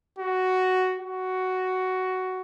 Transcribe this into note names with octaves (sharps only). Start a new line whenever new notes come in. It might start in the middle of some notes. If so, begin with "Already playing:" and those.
F#4
F#4